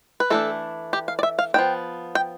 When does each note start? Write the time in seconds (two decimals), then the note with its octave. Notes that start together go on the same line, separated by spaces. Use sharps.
0.20 B4
0.30 E3 A3 D4 A4
0.93 G4
1.08 F5
1.19 D5
1.23 E5
1.39 F5
1.54 F3 B3 D4 G5
2.15 G5